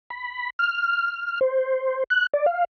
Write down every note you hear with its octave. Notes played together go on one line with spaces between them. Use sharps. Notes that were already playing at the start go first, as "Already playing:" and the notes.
B5
F6
C5
F#6
D5
F5